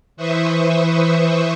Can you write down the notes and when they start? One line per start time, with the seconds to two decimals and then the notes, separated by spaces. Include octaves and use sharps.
0.17 E3 B4 C5 E5 C#6 D#6